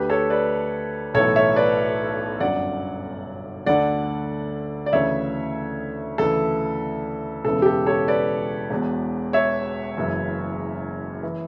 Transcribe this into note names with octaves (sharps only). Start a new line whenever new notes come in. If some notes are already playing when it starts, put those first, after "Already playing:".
Already playing: D2 D3 G4 B4
A4 C#5
B4 D5
B1 A2 E3 A4 C#5
C#5 E5
B4 D5
G1 F#2 D3 D5 F#5
D2 D3 D5 F#5
D5
D2 C#3 E3 C#5 E5
D2 C#3 E3 A4
E1 E2 C#3 E3 A4
G4
A4
A4 C#5
B4 D5
E1 E2 B2
C#5 E5
F#1 F#2 C#3 E3
E3